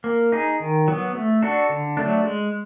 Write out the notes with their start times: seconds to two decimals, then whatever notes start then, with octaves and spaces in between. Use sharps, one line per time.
0.04 A#3
0.32 D#4 G#4
0.60 D#3
0.88 F#3 B3
1.15 A3
1.42 D4 F#4 A4
1.70 D3
1.97 F#3 A3 D4
2.25 G#3